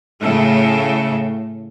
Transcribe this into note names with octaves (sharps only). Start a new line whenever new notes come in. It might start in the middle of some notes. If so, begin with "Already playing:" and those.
A2 C#3 A4